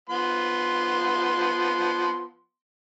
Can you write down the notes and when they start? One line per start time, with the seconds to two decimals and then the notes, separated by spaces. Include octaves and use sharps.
0.09 F3 B3 C6